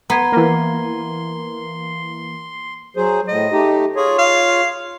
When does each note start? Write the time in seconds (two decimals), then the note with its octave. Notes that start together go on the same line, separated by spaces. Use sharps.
0.10 B3 A#5 C6 G#6
0.32 E3 A#3
2.96 F#3 G#4 C5
3.28 A2 D#5
3.52 A3 D#4 G4
3.96 F4 G#4 C#5
4.18 F5